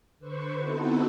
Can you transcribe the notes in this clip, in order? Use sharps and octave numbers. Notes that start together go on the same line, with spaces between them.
D3 B4 C5 C#6
B3 C4 D#4 E4 F#4 A4